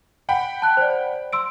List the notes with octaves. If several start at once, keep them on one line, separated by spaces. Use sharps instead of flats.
F#5 G5 B5
A5 F#6
C5 D5
C6 E6 D7